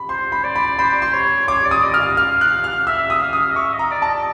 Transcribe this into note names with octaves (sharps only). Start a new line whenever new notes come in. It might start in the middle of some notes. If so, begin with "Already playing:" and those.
Already playing: B5
C5 C6
B5
D5
B5
C5 B5
C6
C#5
C#5 D6
D5
D#6
D#5
F6
F5
F6
F#6
F6
E5 E6
D#6
F5
D#6
D#5
E5 C#6
D#5
A#5
D5
A5
D#5